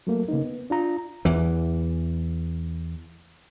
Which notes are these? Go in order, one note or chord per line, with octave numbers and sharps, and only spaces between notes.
F#3 A3 A#3
C#3 A#3 B3 D#4
B3
D4 F4 A#5
E2 E3